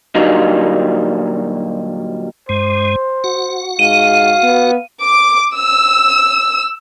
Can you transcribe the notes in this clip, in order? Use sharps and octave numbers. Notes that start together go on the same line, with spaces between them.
A#2 D3 F#3 G3 A#3 D#4
G2 G#3 C5
F#4 F#5
G#2 F5 D#7
B3
D6
E6